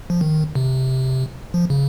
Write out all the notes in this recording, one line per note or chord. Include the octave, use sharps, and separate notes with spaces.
F3
D#3
C3
F3
C#3